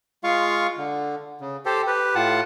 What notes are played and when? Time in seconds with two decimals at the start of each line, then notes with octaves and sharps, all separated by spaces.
0.24 G#3 F4 F5 C#6
0.77 D3
1.41 C#3
1.66 G4 A4 C5
1.87 G4 B4
2.15 A2 F4 F#5 A5